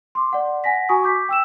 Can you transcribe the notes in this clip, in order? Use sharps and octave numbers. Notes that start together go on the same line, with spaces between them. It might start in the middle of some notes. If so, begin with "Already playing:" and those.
C6 D6
D5 F#5
F#5 G#5 A#6 B6
F#4 G#5 A#5 C#6 D#6
D6 G6 B6
G5 E6 E7